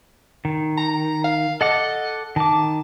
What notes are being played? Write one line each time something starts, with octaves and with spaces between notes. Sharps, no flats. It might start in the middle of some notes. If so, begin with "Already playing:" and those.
D#3
A#5
F5
A4 D#5 F#5 D6
D#3 A5 D6